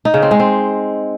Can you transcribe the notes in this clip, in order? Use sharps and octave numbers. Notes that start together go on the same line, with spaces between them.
D#4
C#3
C4
G#3
C4